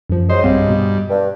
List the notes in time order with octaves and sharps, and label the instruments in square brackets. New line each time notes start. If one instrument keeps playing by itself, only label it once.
[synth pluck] F#2 F3
[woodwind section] F#3 G#3 D#5 [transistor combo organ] C5
[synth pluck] B1 C4 F5 [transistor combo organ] G2
[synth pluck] B2
[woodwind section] G2